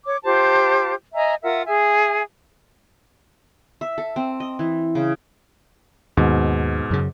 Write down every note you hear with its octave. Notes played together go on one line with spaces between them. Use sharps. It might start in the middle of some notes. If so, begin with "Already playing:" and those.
C#5 D6
F4 G4 C5 A5
D#5 E5 G#5 A#5
F4 A#4 E5 F#5
G#4 E5 G#5
E5
A4
C4
D#5
E3
C#3
D#2 G#2 B2
F#2 C#3